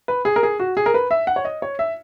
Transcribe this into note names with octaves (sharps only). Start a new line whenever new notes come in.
B4
G#4
A#4
G#4
F#4
G#4
A#4
B4
E5
F#5
C#5
D#5
C#5
E5